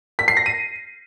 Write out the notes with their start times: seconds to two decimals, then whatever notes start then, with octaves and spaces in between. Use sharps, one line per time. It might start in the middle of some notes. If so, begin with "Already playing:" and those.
0.19 B6
0.28 C7
0.37 A#6
0.46 D#7